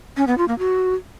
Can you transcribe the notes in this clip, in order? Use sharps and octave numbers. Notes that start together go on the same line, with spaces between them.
C#4
B3
F4
A#3
F#4